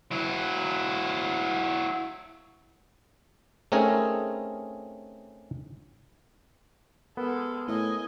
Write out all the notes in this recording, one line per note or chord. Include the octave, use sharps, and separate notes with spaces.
F#3 E4
A3 C4 C#4 D#4 G#4 A#4
G#3 B3 A4 A#4
A2 D#5 G#5